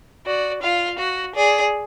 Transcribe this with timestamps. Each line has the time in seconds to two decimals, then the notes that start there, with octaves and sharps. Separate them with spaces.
0.26 F#4 D5
0.63 F4 F5
0.99 F#4
1.36 G#4 D5